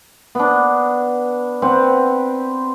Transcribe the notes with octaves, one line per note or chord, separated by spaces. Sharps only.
B3 D4
C4 B4 F#5